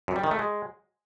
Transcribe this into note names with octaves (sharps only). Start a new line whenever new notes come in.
F#2
G3
D#3
A3
G#3